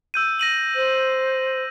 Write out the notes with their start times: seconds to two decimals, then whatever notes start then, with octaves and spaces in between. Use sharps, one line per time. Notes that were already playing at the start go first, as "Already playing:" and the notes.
0.14 E6 G6 D#7
0.39 A#6 D#7 F#7
0.76 C5